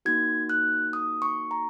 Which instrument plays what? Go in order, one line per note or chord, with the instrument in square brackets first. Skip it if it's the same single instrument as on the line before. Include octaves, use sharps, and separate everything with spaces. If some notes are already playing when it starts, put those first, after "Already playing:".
[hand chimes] A#3 D#4 F#4 G#6
F#6
D#6
C#6
A#5